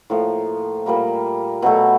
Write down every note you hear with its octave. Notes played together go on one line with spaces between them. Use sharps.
A2 F3 A#3
A#2 G3 A#3
B2 F#3 A3